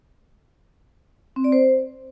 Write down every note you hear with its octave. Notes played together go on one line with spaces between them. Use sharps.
C4
D5
C5